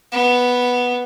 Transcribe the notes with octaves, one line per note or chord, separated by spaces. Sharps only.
B3